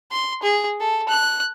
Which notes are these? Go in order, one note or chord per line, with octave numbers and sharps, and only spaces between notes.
C6
G#4
A4
F#6